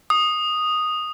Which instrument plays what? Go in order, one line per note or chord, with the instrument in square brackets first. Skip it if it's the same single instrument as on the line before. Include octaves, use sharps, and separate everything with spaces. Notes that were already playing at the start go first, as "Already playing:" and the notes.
[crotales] D#6